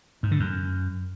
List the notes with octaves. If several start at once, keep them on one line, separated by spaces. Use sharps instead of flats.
G#2
D3
F#2